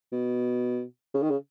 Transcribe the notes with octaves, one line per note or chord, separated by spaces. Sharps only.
B2
C#3
D#3
C#3